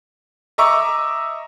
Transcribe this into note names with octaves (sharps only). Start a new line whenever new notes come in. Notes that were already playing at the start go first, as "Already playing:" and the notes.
D#5 E5 A#5 C#6 D6 E6